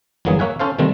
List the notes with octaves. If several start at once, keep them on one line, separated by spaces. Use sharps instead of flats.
G1 E2 F#3 A#3 B3 G#4
A#3 C#5 E5 F#5 G#5
C#4 A4 C5 F5
C3 D#3 G3 A3 C4